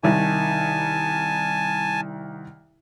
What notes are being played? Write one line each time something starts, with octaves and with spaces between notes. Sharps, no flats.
C2 D#3 G#5 A5